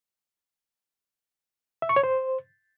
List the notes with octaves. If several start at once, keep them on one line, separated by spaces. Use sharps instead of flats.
E5
C#6
C#5
C5